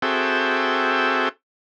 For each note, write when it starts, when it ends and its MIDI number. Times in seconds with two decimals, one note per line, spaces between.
0.02 1.29 60
0.02 1.29 66
0.02 1.29 68
0.02 1.29 69
0.02 1.29 76
0.02 1.29 79